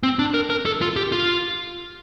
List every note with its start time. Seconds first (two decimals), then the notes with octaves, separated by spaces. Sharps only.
0.03 C4
0.19 D4
0.34 A#4
0.50 A#4
0.66 A4
0.82 F4
0.96 G4
1.12 F4